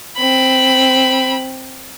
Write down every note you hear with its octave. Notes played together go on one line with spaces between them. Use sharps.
C4 B5